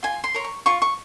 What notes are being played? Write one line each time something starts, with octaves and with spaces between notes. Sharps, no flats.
F4 G#5
C6
A#4 C#5
C#6
F4 C#6
C#6